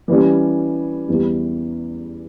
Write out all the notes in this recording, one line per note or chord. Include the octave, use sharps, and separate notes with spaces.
E3 G3 C#4
E2 E3 G3